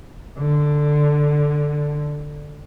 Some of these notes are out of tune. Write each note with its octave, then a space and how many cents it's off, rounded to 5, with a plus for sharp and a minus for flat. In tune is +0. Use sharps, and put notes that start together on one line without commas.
D3 +5